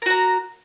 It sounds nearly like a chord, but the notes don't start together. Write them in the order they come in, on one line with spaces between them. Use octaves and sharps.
A#4 F#4 A#5